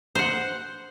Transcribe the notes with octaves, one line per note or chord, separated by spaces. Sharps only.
C5 F#5